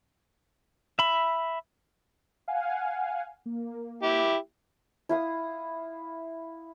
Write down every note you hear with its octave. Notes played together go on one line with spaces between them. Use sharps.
E5 B5
F5 F#5 G#5
A#3
E4 G4
E4 F5 D#6